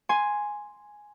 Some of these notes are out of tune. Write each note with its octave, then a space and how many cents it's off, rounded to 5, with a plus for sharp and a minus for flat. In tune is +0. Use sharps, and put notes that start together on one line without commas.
G#5 +0 C6 +0